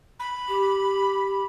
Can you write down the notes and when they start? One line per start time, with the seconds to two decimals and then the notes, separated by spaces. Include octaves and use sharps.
0.19 B5
0.48 G4